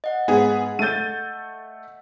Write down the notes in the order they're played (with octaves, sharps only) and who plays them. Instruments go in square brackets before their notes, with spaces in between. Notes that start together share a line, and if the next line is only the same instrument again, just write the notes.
[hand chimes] D#5 F#5
[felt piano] G#2 [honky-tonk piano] B3 G#4
[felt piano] A3 G6 [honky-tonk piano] A6 D#7